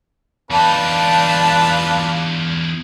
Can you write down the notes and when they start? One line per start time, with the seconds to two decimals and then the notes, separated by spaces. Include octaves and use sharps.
0.51 E2 D4 D#4 F4 B4 A5